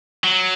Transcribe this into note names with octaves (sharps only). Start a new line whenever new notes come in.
F#3